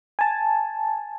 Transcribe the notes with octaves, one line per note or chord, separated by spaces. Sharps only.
G#5 A5